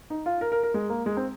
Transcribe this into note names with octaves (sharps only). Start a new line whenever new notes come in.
D#4
F4
A#4
A#4
A#4
G#3
A#3
G#3
C4